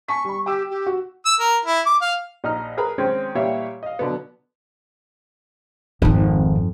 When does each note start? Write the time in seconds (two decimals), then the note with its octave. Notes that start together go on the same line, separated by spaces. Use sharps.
0.08 G#5 A5 C#6 B6
0.25 G3 B5
0.46 G4 G5 D6 E6
0.70 G4
0.86 F#4
1.26 E6
1.40 A#4
1.65 E4
1.86 D6
2.02 F5
2.44 A#1 D#4 D#5 A#5 F6
2.77 G#4 A#4 B4 A#5 B5
2.98 D#3 G#3 C4 C#4
3.35 A#2 E3 G3 C#5 E5 F5
3.83 D#5 F5
3.99 B2 D3 F#3 B3
6.02 G#1 F2 D#3